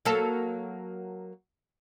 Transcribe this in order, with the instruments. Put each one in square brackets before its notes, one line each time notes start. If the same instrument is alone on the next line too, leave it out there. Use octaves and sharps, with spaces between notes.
[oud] F#3 A#3 A4